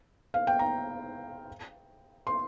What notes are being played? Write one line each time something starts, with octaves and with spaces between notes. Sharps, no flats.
F5
G5
A#5
C6